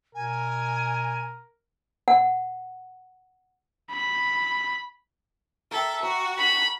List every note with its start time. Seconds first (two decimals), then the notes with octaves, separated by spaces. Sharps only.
0.15 B2 A#4 G#5
2.08 F#5
3.91 B5
5.71 A4 A#4 E5 G5
6.03 F#4 A#5
6.39 B5